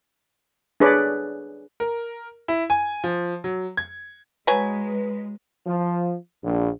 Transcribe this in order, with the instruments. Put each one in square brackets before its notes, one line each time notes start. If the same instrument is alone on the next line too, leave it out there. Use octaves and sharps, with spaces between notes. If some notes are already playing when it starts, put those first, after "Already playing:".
[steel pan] D4 G#4 B4 C#5 D5
[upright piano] A#4
E4
G#5
F3
F#3
G#6
[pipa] F#3 G#5 [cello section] G#3 [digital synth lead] B4
[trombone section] F3
A#1